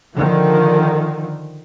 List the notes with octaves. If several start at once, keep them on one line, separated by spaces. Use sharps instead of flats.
D3 D#3 F3